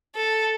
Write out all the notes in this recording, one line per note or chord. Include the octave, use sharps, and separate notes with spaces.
A4